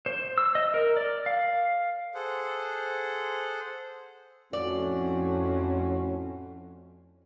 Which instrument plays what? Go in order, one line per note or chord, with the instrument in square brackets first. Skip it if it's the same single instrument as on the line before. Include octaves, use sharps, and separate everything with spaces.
[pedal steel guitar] C5
E6
D#5
A#4
D5
F5
[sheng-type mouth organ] G#4 A4 C5 F#5
[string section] F2 [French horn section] A2 F#4 [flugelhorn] C#4 [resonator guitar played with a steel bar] D5